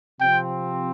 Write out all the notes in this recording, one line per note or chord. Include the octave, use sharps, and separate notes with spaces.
C3 F3 C4 G5